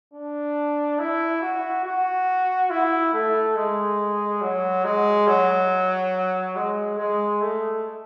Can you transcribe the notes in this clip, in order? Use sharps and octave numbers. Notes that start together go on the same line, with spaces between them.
D4
E4
F#4
F#4
E4
A3
G#3
F#3
G#3
F#3
G#3
G#3
A3